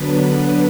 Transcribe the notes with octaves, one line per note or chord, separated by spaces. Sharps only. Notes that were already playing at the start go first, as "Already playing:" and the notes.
Already playing: D3 F#3 B3 D4 B4